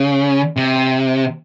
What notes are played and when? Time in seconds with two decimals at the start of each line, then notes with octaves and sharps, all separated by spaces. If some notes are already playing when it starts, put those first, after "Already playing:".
Already playing: C#3
0.56 C3